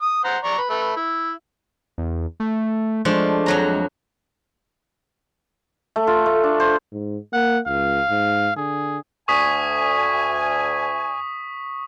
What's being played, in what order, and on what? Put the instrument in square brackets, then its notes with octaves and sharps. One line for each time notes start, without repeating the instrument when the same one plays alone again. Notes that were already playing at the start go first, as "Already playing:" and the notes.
[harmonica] D#6
C5 F#5 A#5
D5 A#5 C#6
B4
A3 B4
E4
[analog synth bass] E2
A3
[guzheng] F3 A3 D4 [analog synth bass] G#3
[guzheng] F2 F#3 A#5
[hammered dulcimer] A3
F4
A3
D4
C5
[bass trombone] G#2
[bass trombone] A#3 [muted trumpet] F#5
[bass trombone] C#2 [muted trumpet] F5
[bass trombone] G#2
[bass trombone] D3 [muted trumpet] G#4
[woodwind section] D2 G#5 [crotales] C#6 D#6 B6